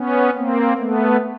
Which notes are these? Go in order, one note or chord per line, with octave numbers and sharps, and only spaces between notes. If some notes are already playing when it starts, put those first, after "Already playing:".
Already playing: B3 C#4
A#3 C4
A3 B3